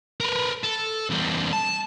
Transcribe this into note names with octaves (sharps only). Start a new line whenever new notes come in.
A#4 B4
A4
E2 G3
A5